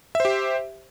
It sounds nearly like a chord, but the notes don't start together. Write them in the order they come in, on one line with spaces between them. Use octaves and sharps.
E5 C5 G4